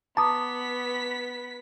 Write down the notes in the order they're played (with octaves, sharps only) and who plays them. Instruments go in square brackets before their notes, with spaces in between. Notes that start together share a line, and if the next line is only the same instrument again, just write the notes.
[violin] B3 B6 [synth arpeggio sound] A5 [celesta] A#5 D6 D#6